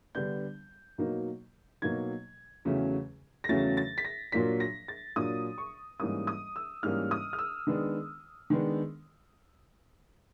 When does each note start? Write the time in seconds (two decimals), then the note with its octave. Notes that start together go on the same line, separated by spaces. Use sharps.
0.15 D3 G3 B3 D4 G6
0.98 B2 F#3 A#3 D#4
1.82 B2 F#3 A#3 D#4 G#6
2.65 E2 C#3 F#3 A3 C#4
3.44 A#6
3.49 E2 C#3 F#3 A3 C#4 A6
3.77 A6
3.98 B6
4.05 A#6
4.32 A#2 F#3 A#3 D4 B6
4.60 A#6
4.88 A6
5.16 A#2 F#3 A#3 D4 D#6
5.58 C#6
5.99 G#2 E3 G3 A#3 C#4 D#6
6.27 D#6
6.56 E6
6.83 G#2 E3 G3 A#3 C#4 F6
7.11 D#6
7.33 F6
7.39 E6
7.67 D#3 G#3 B3 D4
8.50 D#3 G#3 B3 D4